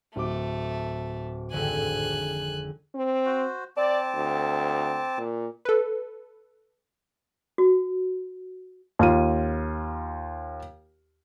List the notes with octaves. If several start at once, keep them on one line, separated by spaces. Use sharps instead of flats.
D1 A3 D6
G#1 F2 D3 G#5 F#6
C4
F#4 C5
C4 D5 A5 D6
D2
A#2
A4 B4
F#4
D#2 F4 D#7